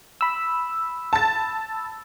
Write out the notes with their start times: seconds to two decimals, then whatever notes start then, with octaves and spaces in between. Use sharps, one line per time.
0.21 B5 E6
1.13 A5 A6